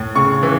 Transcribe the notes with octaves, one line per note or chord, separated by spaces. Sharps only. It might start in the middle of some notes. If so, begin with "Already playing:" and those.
Already playing: A2
C#3 C#6
E3